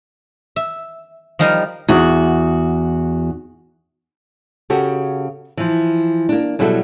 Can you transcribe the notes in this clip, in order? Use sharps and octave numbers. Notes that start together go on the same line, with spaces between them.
E5
F3 G3 D#4 F4 A#4 D#5
E2 F#4
C#3 C#4 F#4 G4 A4
E3 F3
A#3 D4
B2 F#3 G3 E4 G#4 A4